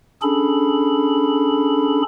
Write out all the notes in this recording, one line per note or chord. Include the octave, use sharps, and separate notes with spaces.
C#4 D4 G#4 A4 B5